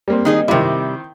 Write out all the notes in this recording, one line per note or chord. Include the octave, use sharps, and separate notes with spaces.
G3 A#3 C4
D#3 D#4 G#4
C3 D#3 G3 C4 E4